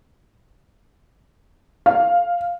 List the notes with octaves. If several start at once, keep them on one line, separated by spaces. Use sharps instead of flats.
F5